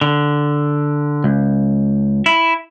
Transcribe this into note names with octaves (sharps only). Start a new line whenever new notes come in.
D3
C#2
E4